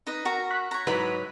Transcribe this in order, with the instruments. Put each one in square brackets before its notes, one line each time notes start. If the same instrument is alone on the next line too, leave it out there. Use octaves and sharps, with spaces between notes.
[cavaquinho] D#4 B4 D#5
F#4 A#4 A#5
[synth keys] C#6 F#6 B6
[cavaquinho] C#5 A#5
[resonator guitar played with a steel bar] G#2 F#3 B4 [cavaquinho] E4 B5